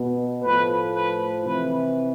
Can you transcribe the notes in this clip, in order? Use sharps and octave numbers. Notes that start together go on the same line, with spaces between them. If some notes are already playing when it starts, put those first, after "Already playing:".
Already playing: B2
A2 F3 B4
B4
C3 E3 B4